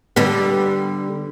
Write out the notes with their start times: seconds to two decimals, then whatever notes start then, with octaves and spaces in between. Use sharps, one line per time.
0.16 D3 G3 B3